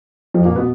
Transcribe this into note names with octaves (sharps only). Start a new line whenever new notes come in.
F2 F3
A#2 A#3
B2 B3